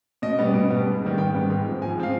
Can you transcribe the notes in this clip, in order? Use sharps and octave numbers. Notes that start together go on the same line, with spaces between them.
B2 D#5
G3 B3
B2
G3 B3
G#2
D#3 G3 B3
G#2 G5
D#3 G3 B3
G#2
F3 C4
G#2 G#5
F3 C4 F5